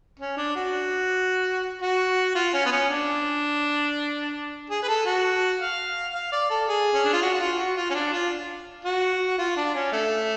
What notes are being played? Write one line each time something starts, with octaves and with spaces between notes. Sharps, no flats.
C#4
D4
F#4
F#4
F4
C#4
B3
C#4
D4
G#4
B4
A4
F#4
F5
F5
D5
A4
G#4
C#4
D4
F4
F#4
F#4
F4
F#4
F4
C#4
D4
F4
F#4
F4
D4
C#4
A3